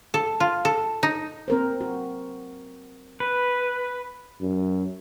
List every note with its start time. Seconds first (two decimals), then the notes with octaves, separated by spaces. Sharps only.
0.14 A4
0.40 F4
0.65 A4
1.03 D#4
1.48 C4 A#4 C5
1.81 F#4
3.20 B4
4.41 F#2